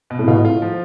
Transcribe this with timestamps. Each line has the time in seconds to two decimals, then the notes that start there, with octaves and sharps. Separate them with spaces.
0.10 B2
0.19 A2
0.28 B2 F4
0.44 A2 F4
0.62 F3